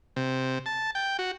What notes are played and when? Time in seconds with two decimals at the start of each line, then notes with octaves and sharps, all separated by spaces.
0.16 C3
0.66 A5
0.95 G5
1.19 F#4